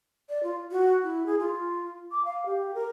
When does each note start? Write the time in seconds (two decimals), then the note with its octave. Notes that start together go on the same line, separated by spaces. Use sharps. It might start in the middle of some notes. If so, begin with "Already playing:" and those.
0.29 D5
0.43 F4
0.71 F#4
1.03 E4
1.26 G#4
1.39 F4
2.11 D6
2.25 F5
2.46 G4
2.74 A#4